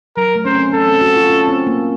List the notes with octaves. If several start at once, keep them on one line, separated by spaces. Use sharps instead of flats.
F#3 A#4
A3
C#4 C5
C4
C#4 A4
C4
F#4
F4
C#4
C4
A#3